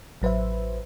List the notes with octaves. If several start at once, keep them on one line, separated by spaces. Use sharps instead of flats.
A1 F#3 B4 C5 E5